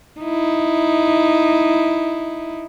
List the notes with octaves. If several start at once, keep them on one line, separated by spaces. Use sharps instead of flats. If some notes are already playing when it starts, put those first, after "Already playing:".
D#4 E4